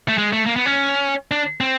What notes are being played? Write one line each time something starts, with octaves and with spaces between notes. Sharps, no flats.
A3
G#3
A3
A#3
B3
C#4
D4
C4